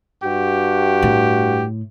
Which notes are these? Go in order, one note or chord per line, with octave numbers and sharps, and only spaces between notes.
G2 F#4 G4
A2